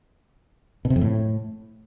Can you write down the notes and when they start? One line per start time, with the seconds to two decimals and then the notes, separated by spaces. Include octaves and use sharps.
0.85 B2
0.90 C3
0.96 F2
1.01 A2